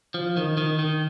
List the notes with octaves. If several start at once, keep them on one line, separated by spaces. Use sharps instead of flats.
F3
D#3
D#3
D#3